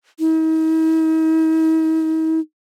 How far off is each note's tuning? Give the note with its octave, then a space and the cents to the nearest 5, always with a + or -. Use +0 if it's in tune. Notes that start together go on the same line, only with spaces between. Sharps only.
D#4 +45